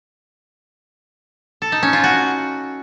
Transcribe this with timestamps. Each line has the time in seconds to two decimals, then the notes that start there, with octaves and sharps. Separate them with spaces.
1.62 A4
1.72 D#4
1.83 C#4
1.93 F4
2.04 F#4